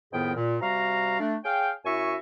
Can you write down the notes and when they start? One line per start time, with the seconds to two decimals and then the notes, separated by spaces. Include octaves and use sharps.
0.13 F2 A2 D#3 B3 G#4 G5
0.36 A#2
0.61 C3 G3 F#4 F5 A#5
1.20 A3 D4
1.45 G#4 C#5 F5 G5
1.85 F#2 E4 F#4 E5 G#5 C#6